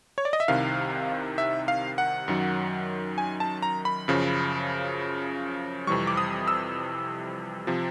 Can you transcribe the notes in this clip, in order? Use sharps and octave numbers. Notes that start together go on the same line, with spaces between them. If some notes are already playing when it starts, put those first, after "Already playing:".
C#5
D5
D#5
E5
C2 C3 D#3 F5
E5
F5
F#5
F#2 D#3 F#3
G#5
A5
A#5
B5
F#2 C#3 F3
F2 C3 E3 G3 C#6
D6
D#6
E6
C3 F3